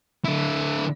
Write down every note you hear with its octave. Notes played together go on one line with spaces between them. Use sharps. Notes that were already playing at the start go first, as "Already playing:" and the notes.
D3 E4